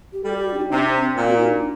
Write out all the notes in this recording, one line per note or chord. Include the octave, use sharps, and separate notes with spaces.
G4
G3 A4
F#4
G4
F#4
D4
D#4
C3 D4
D#4
D4
C4
A#2
F#4
D#4
D4